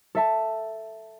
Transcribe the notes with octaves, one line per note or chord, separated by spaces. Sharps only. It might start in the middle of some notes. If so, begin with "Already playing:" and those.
A4 E5 A5